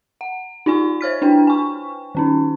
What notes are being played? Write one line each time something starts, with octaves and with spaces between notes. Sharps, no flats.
F#5
D#4 F4 D5 G#5 C#6
C5 C#5 F6 B6
D4 E4 B4 G5
G#5 C#6
D#3 C#4 D#4